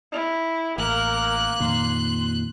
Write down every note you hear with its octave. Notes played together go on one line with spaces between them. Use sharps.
E4
A1 A#3 A#4 F#6
F2 A#2 D#3 C6